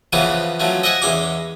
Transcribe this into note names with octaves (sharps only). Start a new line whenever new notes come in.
C#3 E3 F3 B3 C#4 B4
F3 F#3 A3 C#4
D#5 E5 F#5 G#5
E2 G#3 C#4 D6